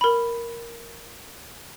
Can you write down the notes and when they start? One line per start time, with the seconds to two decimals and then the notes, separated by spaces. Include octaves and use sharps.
0.01 A#4 B5